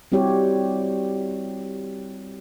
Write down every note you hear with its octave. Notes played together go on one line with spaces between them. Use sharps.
G3 C4 E4 F#4 G4 C#5